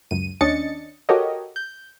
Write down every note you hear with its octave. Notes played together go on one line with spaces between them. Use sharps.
C#2 F#2 D#7
D#2 C#4 D4 D#5 A6 C#7
F#4 G4 A4 A#4 C#5 D#5
G6